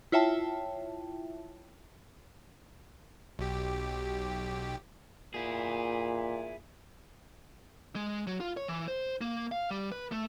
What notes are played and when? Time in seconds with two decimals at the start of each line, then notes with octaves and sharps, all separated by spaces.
0.12 E4 F4 C#5 E5 G5 A5
3.39 B1 G4
5.34 A#2 E4 G#4
7.96 G#3
8.27 F#3
8.40 F4
8.57 C#5
8.68 E3
8.88 C5
9.21 A#3
9.52 F5
9.71 G3
9.92 B4
10.12 A3